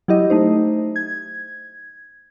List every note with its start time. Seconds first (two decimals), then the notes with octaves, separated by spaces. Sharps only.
0.08 F#3 E4 G4 D#5
0.30 A3 D#4 C5
0.96 G#6